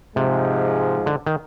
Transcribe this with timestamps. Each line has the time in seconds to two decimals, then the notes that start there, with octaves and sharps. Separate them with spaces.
0.15 G#2 C3 F3 G#3
1.06 D3
1.26 D#3